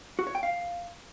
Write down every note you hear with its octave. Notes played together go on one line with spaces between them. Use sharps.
F#4
C#5
G5
F5